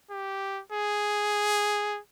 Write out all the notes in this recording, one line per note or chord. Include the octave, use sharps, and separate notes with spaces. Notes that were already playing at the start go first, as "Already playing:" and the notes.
G4
G#4